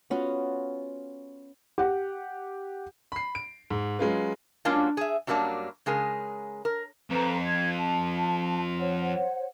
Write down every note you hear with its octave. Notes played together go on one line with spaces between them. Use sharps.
B3 C#4 F4 F#4
G4 F#5
B5 C7
D7
G#2
F#3 G#3 C#4 F4 B4
F#3 G#3 A#3 C#4 D4 F4
G#4 E5
F#2 F#3 G3 A#3 D4
C#3 G#3 G#4 A#4
A#4
F2 A4 B4 A#5
G#6
A5
C5 C#5 F#5